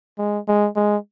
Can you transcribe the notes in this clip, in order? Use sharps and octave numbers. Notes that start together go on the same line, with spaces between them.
G#3
G#3
G#3